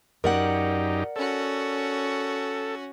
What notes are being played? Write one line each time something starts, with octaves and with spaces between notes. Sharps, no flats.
F#2 D#4 G4 A#4 D5 F#5
C#4 F#4 A4